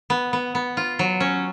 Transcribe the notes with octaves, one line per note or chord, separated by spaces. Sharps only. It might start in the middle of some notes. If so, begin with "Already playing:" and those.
B3
B3
B3
F4
F#3
C#4